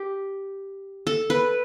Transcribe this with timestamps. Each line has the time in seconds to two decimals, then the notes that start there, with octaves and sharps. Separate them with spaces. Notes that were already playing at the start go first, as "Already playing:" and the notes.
Already playing: G4
1.07 A4
1.30 B4